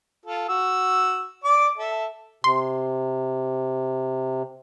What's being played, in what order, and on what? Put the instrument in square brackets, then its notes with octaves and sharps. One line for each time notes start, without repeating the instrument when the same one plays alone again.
[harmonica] F4 A4
F#4 E6
D5 D6
A4 E5
[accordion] C3 [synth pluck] C6